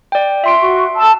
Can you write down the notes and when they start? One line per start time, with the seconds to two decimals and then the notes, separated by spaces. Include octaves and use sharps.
0.12 D5 G5
0.44 F4 E5 C6 D7
0.60 F#4 C#6
0.96 A5 E6